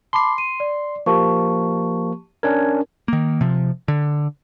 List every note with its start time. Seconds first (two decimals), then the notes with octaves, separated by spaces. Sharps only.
0.13 A5 B5 C6 D6 C7
0.38 D#7
0.60 D5
1.06 F3 A#3 G4 A5 C#6
2.43 C#4 D4 A#4 G#6
3.08 D#3 A#3
3.41 C3 F3
3.88 D3